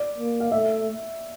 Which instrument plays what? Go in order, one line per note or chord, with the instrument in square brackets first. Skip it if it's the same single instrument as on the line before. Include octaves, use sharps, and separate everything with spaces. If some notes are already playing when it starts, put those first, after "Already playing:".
Already playing: [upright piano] D5
[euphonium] A#3
[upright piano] F5
[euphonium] A3 [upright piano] E5